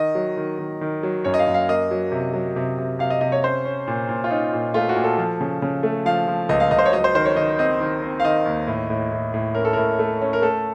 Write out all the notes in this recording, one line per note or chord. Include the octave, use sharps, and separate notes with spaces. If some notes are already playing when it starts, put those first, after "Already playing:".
Already playing: D#3 D#5
F#3
D#3
D#3
D#3
F#3
F#2 C#5
D#5
F5
F#2
F5
A#3 D#5
F#3
C3
F#3
C3
C3
C3 F5
D#5
C3 D#5
C#5
C#4 C5
C#4
A#2
A#2
F4
C#4 D#4
A#2
A3 F4
F#4
A#2
A4
F3
C#3
C#3
A3
F3 F5
F3
C#2 D#5
F5
C#2 D#5
C5
C#5
F#3 D#5
C5
D#3 C5
C#5
D#3 D#5
C4 D#5
D#3
C4
F5
D#3 D#5
D#2
A2
A2
A2
A2
C#4 A#4
A4
A2 A#4
A3
C#4
A#4
A3 A4